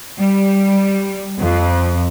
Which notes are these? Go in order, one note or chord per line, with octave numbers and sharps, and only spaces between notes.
G3
F2